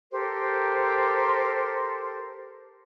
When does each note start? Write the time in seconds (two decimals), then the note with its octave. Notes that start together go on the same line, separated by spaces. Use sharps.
0.11 G4 A4 A#4 C5